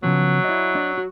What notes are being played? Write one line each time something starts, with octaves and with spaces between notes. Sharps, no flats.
C#3 F3 F#3 B3
E4 D5 D#5
D4 D5 D#5
F#4